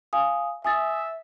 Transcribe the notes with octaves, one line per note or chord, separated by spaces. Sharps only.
F5 G#5 D#6
E5 G#5 D#6 A6